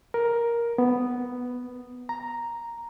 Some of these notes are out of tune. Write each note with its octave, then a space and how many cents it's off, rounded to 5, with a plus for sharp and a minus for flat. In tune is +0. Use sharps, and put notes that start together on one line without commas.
A#4 +10
B3 +5
A#5 +0